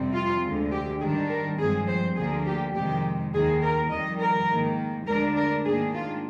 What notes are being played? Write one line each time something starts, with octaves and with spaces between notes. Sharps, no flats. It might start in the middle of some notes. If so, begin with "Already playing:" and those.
Already playing: F2 C3 G3 C4
F4
D2 D3 G#3
G4
G#2 D#3 G3 D4 G#4
A#4
G2 F3 G#3 C4 G#4
C5
D2 D3 F3 A#3 G#4
G4
F2 C3 D#3 G#3 G4
D#2 D#3 A#3 G#4
A#4
F2 D#3 G3 D#5
A#4
G#2 D#3 A#3
D2 D3 G#3 D4 A#4
A#4
G#2 D#3 A#3 D4 G#4
F4